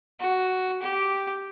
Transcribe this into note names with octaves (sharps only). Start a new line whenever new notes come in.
F#4
G4